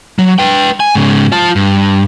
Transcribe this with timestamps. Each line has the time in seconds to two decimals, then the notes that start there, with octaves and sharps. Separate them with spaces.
0.19 F#3
0.39 B4 G5
0.80 G#5
0.95 G#2 C#3
1.32 F4 A5
1.56 G2